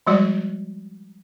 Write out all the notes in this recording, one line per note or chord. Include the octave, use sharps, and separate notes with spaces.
F3 G3 G#3 F#4 D5